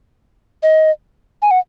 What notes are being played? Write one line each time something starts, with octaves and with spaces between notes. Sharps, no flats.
D#5
G#5
F#5